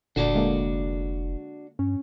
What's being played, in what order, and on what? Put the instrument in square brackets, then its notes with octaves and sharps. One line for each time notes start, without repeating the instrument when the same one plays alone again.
[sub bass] F1 [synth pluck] A#2 D3 [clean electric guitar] D4 F#4 D5
[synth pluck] D3 G#3 A#3
[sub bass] G2 [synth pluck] C#4